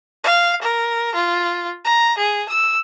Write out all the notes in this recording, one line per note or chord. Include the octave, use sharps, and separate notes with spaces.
F5
A#4
F4
A#5
G#4
E6